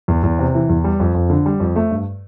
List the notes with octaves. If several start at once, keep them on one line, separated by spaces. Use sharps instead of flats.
E2
E2
C3
E3
E2
G3
F2
F2
D3
G3
F2
A3
G2